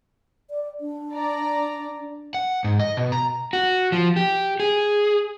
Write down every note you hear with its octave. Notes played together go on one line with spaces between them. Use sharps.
D5
D4
D5 A#5
F#5
G#2
D#5
B2
A#5
F#4
F3
G4
G#4